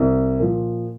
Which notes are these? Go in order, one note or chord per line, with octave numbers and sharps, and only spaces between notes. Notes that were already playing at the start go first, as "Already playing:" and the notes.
Already playing: C2
A#2 F3